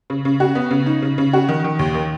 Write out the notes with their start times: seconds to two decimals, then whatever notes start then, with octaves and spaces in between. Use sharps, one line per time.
0.10 C#3
0.25 C#3
0.40 F#4
0.55 B3
0.71 C#3
0.86 D#4
1.02 C#3
1.18 C#3
1.33 F#4
1.49 D#3
1.64 D#3
1.79 D#2
1.94 D#3